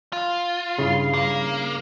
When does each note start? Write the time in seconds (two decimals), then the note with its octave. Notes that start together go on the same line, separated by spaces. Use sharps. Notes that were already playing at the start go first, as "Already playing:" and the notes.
0.13 F4
0.79 G2 C#3 E4 F5
1.14 A#3